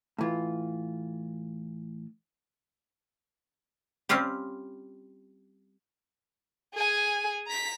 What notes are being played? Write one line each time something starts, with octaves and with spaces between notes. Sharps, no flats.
A2 E3 F4
G3 C4 C#4 F4 G4
G#4 G#5
A#5 B6